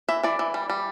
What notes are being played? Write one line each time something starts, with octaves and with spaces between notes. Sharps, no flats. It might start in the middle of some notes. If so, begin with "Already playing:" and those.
E3 E5
E3 D5
E3
G3
G3